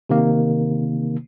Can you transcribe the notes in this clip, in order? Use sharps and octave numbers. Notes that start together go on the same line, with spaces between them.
C3 D#3 A#3